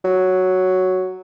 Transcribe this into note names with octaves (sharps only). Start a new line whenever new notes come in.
F#3